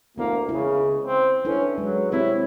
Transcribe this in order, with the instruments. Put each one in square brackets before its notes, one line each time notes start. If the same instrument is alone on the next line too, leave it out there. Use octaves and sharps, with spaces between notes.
[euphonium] D2 [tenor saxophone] A#3 [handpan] B3 E4
[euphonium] C#2 [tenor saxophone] C#3 [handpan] E4
[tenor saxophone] C4
[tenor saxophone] C#4 [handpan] D4 E4 A4 [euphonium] B4
[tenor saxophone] F#3 [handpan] G#3
[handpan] C4 G4 C#5 [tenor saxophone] E4